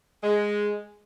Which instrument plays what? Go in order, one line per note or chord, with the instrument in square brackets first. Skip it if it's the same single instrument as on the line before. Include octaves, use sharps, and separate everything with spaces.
[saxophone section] G#3